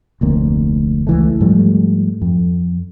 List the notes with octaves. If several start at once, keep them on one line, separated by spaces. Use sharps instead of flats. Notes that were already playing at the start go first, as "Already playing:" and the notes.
F1 D2 A#3 C4
C#2 E3 A3
G#2 F3 G3 A3
F2